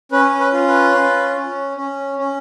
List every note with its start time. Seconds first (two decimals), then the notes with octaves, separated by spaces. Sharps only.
0.12 C#4 B4
0.40 B4
0.53 F4
0.68 B4
0.95 C#4
1.36 C#4
1.77 C#4
2.19 C#4